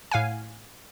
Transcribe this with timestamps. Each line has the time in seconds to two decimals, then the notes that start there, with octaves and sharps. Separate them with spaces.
0.11 A2 F5 F#5 G#5